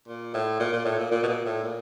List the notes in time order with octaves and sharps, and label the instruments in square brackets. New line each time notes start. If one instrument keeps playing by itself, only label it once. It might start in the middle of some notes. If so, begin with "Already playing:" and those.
[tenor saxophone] A#2
A2
A#2
A#2
A2
A#2
A#2
B2
A#2
A2
A#2